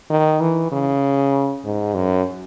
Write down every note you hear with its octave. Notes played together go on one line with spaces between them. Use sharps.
D#3
E3
C#3
G#2
F#2